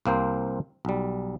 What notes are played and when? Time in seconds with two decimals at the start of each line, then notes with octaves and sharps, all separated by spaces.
0.06 C2 A#3 C4 C5
0.85 B1 G3